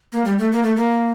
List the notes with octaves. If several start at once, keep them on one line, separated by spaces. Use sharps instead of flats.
A#3
G3
A3
A#3
A3
A#3